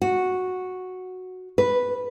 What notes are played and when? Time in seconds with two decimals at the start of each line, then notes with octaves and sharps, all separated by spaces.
0.02 F#4
1.58 B4